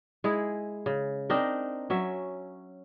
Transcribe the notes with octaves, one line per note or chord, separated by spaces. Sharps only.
G#3 E4 G#4
C#3
C4 D4 D#4 A#4
F#3 C#4 E5